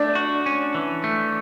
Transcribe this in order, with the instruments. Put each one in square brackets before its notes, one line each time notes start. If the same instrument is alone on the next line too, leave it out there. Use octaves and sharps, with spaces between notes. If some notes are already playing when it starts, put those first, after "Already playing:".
Already playing: [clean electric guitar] A3 [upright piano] D4
[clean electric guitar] F#4
C#4
E3
A3